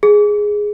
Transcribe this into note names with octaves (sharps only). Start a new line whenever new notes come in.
G#4